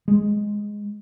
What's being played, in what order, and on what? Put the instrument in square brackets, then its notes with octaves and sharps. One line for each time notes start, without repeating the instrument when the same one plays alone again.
[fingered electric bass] G#3